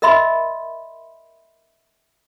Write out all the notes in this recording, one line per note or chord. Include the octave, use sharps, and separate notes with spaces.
A#4 D#5 E5 B5 C6